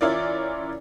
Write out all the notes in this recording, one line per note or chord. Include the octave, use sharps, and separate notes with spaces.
E3 C#4 E4 F4 A#4 D5